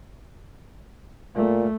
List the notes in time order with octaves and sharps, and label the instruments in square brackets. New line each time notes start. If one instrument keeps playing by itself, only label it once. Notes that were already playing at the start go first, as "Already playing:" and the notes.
[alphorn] A#2 [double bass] A3